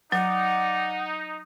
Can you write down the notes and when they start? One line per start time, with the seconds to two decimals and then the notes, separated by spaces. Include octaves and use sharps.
0.12 F#3 D#4 D5 F#5